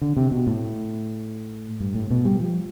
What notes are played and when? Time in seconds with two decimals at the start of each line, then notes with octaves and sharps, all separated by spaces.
0.02 D3
0.17 C3
0.31 B2
0.47 A2
1.80 G2
1.95 A2
2.11 B2
2.25 G3
2.40 F3